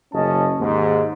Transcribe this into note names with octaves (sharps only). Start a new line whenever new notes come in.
F#1 C#4 D#5 A5
D#2 G#2